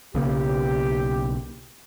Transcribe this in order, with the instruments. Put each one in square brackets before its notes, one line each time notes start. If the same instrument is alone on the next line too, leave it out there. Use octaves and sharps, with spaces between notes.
[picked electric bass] B1 C#3 A#3 [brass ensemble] G4